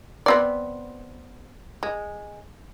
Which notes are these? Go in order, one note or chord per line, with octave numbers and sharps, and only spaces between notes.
B3 C4 D5
G#3